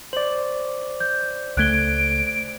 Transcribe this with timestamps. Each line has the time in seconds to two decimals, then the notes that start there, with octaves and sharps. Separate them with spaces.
0.13 C5 D5 F#7
1.00 G6
1.57 C#2 A3 F#6 G#6 D7 G7